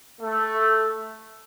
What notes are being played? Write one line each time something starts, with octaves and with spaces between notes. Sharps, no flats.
A3